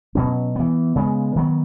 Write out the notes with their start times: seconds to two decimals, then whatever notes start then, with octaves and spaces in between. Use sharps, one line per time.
0.15 B2 F#3 C#4
0.56 E3 B3
0.96 C#3 G#3 B3
1.36 D#3 F#3 B3